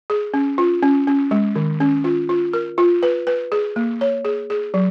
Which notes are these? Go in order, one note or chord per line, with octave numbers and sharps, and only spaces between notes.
G#4
C#4
F4
C#4
C#4
G#3
D#3
C#4
F4
F4
A#4
F4
B4
B4
G#4
A#3
C#5
G#4
G#4
F#3